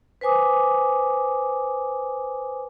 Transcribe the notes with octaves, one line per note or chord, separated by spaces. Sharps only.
B4 C5 G#5 D6 D#6